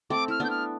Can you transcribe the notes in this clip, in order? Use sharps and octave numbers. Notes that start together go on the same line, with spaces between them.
A3 C4 D6
E4 F6
B3 D4 G6
F6